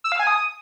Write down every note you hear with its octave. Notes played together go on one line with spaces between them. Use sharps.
E6
F5
G#5
D#6